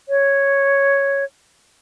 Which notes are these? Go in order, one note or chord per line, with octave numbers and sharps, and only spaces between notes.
C#5